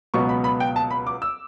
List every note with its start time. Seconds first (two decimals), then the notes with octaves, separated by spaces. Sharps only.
0.14 C#2 B2 F#3 B3 C#6
0.29 B5
0.44 B5
0.60 G5
0.76 A5
0.91 B5
1.07 D6
1.22 E6